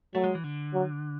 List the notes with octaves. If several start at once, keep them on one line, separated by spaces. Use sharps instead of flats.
F#3 A3
G#3
E3
D3
F#3